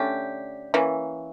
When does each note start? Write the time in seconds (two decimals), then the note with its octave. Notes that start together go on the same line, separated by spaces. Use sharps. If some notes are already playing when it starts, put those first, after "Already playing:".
Already playing: D3 A3 C#4 G4
0.74 E3 A#3 C#4